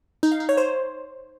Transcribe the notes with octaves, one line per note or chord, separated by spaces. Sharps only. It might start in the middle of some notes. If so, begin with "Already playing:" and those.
D#4
F5
D#4
C#5
C5